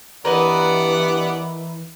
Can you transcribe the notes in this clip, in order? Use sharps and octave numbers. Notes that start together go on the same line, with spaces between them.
G2 E3 B3 A#4 B4 D5 D#5 F#5